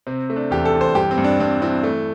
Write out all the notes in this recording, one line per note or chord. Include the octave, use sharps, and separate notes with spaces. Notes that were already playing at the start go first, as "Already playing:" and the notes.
C3 C4
A3
D4
E2 G4
A4
E2
C5
G2 G4
C4
G2
D4
G2 C4
E3 C4
A3